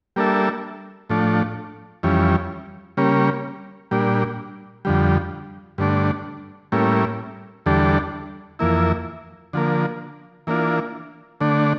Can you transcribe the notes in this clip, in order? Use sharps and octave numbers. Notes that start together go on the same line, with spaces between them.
G3 A#3 D4 A4 E5
A2 F3 A3 D4
F2 E3 G3 C#4
C#3 G3 A#3 C#4
A#2 G3 D4
F2 D3 G3
G2 D3 A3 D4
A2 G3 A#3 C#4 E4
E2 D3 G3 D4 A4
F2 E3 A#3 E4
D3 F3 A#3
E3 A#3 D4 F4
D3 A3 D4